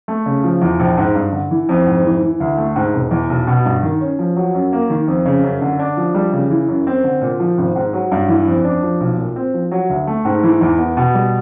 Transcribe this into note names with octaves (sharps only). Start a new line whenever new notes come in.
A3
C#3
F3
E2
A#1
G#2
G2
D3
E3
F2
G#2
E3
E3
D2
A3
G#2
E1
E2
B1
B2
G2
D#3
C#4
F3
F#3
F#2
A#3
D#3
F2
C#3
F#2
D3
D4
F3
G3
C#3
E3
F#2
C4
D3
A#2
F3
G#1
G#2
F#3
G2
E3
F2
D4
F3
B1
A#2
C4
F3
F#3
D2
A3
G#2
E3
E2
B3
B2
G3